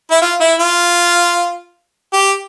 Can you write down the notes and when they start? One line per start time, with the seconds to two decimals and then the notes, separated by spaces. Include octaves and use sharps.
0.11 E4
0.22 F4
0.40 E4
0.59 F4
2.13 G4